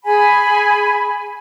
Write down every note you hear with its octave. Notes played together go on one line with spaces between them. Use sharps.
G#4 G#5 B5